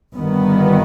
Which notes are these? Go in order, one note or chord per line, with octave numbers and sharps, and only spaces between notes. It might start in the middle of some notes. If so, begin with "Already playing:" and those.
G1 G2 D#3 B3